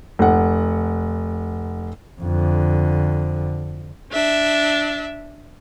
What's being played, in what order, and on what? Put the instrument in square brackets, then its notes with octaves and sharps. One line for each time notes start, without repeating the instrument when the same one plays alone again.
[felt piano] F1 F#5
[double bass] F2 D3
[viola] D4 E5